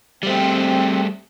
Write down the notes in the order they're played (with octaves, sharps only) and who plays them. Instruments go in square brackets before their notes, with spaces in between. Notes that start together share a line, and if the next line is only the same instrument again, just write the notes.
[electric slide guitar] G3 A3 [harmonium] C4